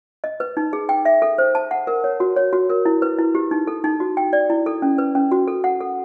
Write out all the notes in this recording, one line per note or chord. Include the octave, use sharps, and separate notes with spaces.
D#5
B4
D#4
G#4
G5
E5
A4
C5
A5
F#5
A#4
C#5
F#4
C#5
F#4
A#4
E4
B4
E4
G4
D#4
A4
D#4
F#4
G5
D5
E4
A4
C#4
B4
C#4
F#4
A4
F#5
A4